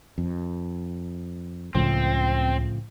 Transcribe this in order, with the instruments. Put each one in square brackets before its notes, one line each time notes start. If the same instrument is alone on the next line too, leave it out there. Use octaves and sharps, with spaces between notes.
[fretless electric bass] F2
[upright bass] C#2 [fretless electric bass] A2 C#3 F3 [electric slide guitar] C4